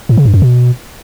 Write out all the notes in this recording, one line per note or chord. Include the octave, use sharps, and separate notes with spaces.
A2
C#3
G2
F#2
B2